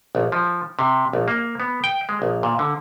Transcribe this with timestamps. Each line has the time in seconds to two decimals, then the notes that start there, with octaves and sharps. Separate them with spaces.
0.15 A#1
0.32 F3
0.79 C3
1.13 A#1
1.28 A#3
1.60 B3
1.84 G5
2.09 G#3
2.22 A#1
2.43 A#2
2.59 D3